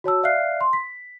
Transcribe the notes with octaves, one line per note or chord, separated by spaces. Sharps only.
F#4 C#5 A5 E6
D5 E5 F5 F6 F#6 C7
C6
B6